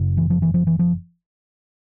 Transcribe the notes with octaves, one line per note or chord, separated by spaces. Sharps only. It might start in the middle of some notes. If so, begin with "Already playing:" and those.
Already playing: F#1 F#2 C#3
E3
F3
E3
F3
E3
F3